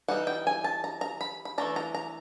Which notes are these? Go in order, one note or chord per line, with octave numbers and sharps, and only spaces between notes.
E3 G3 D#4 F#5
G5
G#5
A5
A#5
A#5
B5
B5
E3 A3 D4 A#5
A#5
A#5